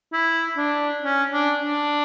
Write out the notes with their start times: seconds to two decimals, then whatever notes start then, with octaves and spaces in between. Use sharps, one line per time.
0.13 E4
0.57 D4
1.02 C#4
1.32 D4
1.62 D4